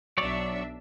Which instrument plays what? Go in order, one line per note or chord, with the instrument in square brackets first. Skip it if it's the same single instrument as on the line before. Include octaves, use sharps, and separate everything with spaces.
[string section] B1 D4 E5 [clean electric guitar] F#3 C#5 D5